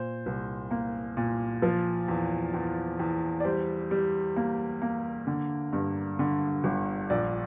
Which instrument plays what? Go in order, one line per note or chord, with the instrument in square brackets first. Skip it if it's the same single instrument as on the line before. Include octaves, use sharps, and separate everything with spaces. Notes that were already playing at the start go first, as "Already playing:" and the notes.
Already playing: [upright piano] A#2 C5
C2
A#3
A#2
F3
E2
E2
E2
D5
G3 C5
G3
A#3
A#3
D3
G2
D3
G1
A#1 D5